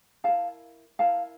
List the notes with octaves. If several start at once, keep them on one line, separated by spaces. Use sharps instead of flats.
E4 A#4 F5 A5
E4 A#4 F5 A5